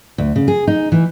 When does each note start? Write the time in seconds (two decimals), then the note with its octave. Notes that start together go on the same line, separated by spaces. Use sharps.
0.18 D2
0.36 C#3
0.48 G#4
0.67 D#4
0.92 E3